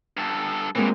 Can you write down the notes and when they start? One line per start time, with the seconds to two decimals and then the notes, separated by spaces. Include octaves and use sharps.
0.17 G2 A4
0.75 E3 F#3 G#3 A#3 C4